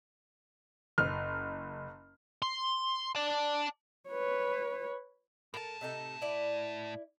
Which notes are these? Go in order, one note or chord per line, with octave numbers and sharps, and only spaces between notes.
F#1 F6
C6
D5 A5
B4 C#5
A2 A4 A#4 A5
C3 D#4 A4
E4 D5